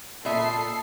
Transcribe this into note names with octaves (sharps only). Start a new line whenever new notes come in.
A#2 A4 D5 E5 B5 D#6 C7